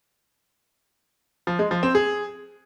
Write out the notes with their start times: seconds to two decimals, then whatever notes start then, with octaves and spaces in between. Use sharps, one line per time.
1.47 F3
1.59 G#3
1.71 F3
1.83 C4
1.95 G#4